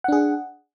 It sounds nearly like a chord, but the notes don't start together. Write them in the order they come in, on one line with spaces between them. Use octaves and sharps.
F#5 D4 G#4